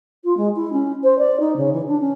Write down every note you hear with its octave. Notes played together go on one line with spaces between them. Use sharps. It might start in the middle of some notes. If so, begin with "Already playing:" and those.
F4
G#3
E4
C#4
C5
D5
D#4
C#3
E3
D4
C#4